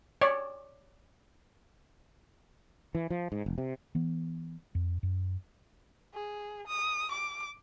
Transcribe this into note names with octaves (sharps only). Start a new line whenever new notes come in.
C#5 D5
E3
F3
G#2
F1
C3
E3 B3
F2
F#2
G#4
D#6
D6